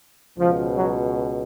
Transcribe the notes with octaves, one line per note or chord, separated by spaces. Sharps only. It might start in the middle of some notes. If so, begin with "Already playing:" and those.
C#2 B2 F3
F#3